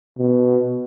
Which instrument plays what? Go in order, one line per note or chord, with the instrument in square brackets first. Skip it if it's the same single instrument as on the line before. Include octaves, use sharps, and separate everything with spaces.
[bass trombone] B2